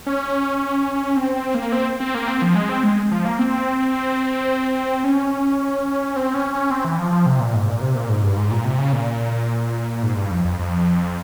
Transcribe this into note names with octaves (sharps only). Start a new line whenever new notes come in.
C#4
C4
C4
A#3
C4
C4
A#3
C4
F3
G#3
C4
G#3
F3
A#3
C4
C#4
C4
C#4
C#4
C4
E3
F3
F3
C3
A#2
G#2
A#2
C3
A#2
G#2
G2
G#2
A#2
C3
C#3
A#2
G#2
G2
F2
F2
F2